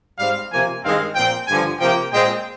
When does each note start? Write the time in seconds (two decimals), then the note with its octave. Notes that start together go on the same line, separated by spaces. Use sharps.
0.19 G#2 G3 C4 F5
0.51 C3 F3 A#3 G#5
0.83 G2 D#3 G#3 C4 F5
1.15 A#2 F3 C4 G5
1.47 G2 D3 F3 G#5
1.80 C3 F3 A#3 G5
2.12 A#2 G#3 C4 G5